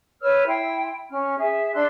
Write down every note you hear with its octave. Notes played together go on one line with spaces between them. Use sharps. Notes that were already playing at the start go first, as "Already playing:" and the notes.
B4 C#5 E6 F6
E4 G5 C6
C#4 F6
G#4 E5
D4 C6 E6 F#6